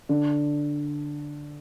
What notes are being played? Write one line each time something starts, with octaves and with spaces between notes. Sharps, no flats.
D3